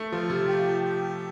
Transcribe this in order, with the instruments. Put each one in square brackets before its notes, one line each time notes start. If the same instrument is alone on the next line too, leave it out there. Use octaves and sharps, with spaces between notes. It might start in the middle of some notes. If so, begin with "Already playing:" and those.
Already playing: [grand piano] A3
[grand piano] F3 [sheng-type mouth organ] F4
[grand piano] C3
[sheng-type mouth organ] G4
G4